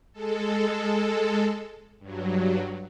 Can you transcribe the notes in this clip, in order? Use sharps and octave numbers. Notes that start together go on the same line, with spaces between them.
G#3 A4
G2 F#3